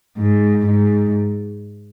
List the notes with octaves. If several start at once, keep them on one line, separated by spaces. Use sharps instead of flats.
G#2
G#2